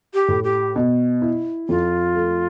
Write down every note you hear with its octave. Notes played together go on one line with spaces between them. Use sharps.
G4
A2
G4
B2
E4
F2 F4
A3